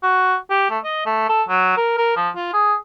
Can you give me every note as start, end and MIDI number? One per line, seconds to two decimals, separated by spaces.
0.03 0.36 66
0.50 0.67 67
0.70 0.79 57
0.84 1.06 75
1.06 1.26 57
1.29 1.43 69
1.49 1.73 54
1.77 1.94 70
1.98 2.16 70
2.16 2.29 53
2.36 2.51 65
2.53 2.75 68